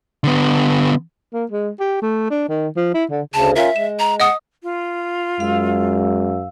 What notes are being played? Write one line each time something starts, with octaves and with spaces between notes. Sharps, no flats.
D3 B3
A#3
G#3
G4
A3
D4
D#3
F3
E4
D3
D2 C#3 A5
C#4 F4 A#4 E5
G#3 E7
A#5
D#5 F#5 D#6
F4
F#2 G#3 F5 E6